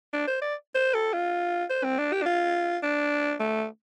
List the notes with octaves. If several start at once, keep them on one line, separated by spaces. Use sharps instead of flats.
D4
C5
D5
C5
A4
F4
C5
C4
D4
G4
D4
F4
D4
A3